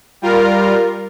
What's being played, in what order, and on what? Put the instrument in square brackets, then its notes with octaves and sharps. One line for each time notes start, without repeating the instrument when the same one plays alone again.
[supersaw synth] G3 F4 A#4